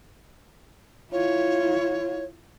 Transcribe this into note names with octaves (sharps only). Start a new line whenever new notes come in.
E4 F4 C#5